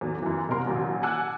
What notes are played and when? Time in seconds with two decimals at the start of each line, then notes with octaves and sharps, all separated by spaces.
0.01 E2 A2 D#3 F#3
0.23 F#2 E3
0.49 C2 C3 A#4 C6
0.66 A1 D#2 A#2 F#3
1.03 F#5 G#5 A5 D6 E6 F#6